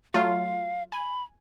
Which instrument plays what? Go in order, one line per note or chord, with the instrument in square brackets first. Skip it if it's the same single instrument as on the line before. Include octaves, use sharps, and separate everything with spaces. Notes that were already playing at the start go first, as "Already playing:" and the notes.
[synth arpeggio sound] F#3 A3 F4 [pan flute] F5
[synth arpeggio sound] G#5 [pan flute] B5